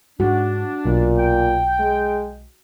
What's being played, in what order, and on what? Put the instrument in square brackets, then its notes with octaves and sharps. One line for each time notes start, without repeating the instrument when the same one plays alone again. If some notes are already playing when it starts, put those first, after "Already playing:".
[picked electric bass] G#2 [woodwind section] D4 [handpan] F#4
[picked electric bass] B1 [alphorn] A#2
[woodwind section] G5
[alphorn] G#3